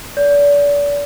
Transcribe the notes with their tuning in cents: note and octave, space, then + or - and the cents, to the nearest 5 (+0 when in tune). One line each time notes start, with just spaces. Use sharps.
D5 -35